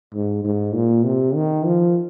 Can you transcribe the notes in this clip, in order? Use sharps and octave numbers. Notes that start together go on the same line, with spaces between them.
G#2
G#2
A#2
C3
D#3
F3